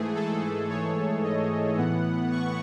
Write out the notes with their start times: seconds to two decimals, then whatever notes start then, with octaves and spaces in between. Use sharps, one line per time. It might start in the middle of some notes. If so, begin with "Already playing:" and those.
Already playing: G#2 E3 A3 G#4
0.15 A4
0.70 C#5
1.24 D#5
1.77 A2 E3 B3 F#5
2.32 C#6